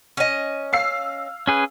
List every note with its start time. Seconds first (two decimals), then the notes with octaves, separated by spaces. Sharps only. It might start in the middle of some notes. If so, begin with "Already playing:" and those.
0.17 C#4 D#5
0.73 F5 E6 C7
1.47 C#4 G#4 B4